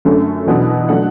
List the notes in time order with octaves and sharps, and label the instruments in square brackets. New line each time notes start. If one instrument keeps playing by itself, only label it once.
[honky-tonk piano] F#2 D3 A3 C#4
E2 B2 F#3 B3 D4
D3 F#3 A3 D4 F#5